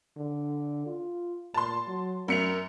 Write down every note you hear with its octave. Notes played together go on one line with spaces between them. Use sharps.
D3
F4
A#2 A5 C6
F#3
F#2 A#4 C#7 F7